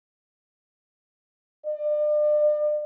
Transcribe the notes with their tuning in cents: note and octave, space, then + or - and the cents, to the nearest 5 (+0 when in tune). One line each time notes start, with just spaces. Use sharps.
D5 +35